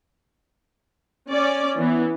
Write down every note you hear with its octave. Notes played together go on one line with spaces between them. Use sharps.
C#4 D5
E3 B3